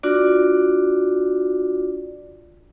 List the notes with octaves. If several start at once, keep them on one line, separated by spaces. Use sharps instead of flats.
D4 F4 F#4 D5